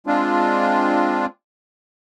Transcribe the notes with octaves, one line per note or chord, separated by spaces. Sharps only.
G#3 C4 D4 F4